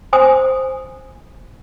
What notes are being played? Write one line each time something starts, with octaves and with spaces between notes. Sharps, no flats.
C5 G#5 D#6